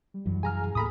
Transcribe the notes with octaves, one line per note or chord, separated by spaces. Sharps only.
G3
F#2 E3 F#3
G#4 F5 G#5 A#5 F6
D#2 A2 A#3 A4 A#5 B5 D#6